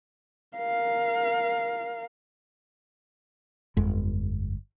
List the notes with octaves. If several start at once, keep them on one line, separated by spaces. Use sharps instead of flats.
A#4 F5
G1 F2 G#3